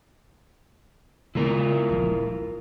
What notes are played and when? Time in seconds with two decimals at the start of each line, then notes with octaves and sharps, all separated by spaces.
1.35 C#3 G#3 B3 E4 F4 A#4
1.89 D1 A#1 F3